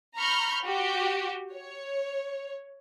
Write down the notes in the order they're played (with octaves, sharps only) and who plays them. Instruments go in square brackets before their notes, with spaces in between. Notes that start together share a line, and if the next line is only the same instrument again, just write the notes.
[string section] A#5 B5 C#6 F6 G6
F#4 G4
C#5